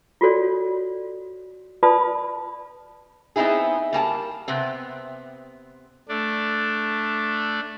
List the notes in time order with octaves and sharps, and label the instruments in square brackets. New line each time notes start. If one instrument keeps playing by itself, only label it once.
[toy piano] F4 F#4 A4 C#5 D5
F4 B4 D5 A5 B5 D#6
[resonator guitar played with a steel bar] B3 C4 D#4 E4 G#4
G3 A#3 G#5 A5
C3 B3 C4
[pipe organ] A3 D4 D5